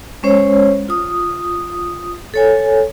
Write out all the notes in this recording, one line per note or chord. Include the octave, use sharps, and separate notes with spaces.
G#3 C#4 C5 C#5
F4 D#6
A4 C#5 G#5